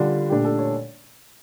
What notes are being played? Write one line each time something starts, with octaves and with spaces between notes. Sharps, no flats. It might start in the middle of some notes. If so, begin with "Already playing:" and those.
Already playing: D3 G3 D4 F4
A#2 A3 D4 G4
A4
C#5